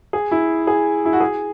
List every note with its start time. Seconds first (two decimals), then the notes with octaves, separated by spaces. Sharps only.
0.13 G#4
0.31 E4
0.67 G#4
1.05 E4
1.13 F#4
1.20 G#4